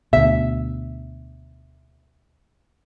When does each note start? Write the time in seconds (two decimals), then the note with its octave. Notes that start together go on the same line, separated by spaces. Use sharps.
0.13 D2 B2 E5